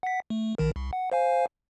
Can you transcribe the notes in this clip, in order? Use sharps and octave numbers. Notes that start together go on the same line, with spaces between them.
F#5 B6
A3
A#1 D#3 A#4
C2
F#5
C5 F5 G#5